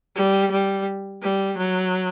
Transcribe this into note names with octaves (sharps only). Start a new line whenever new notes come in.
G3
G3
G3
F#3